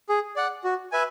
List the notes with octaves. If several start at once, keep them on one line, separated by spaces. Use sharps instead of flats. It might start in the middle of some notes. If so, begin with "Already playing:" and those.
G#4
D5 F#5
F#4
B4 E5 G#5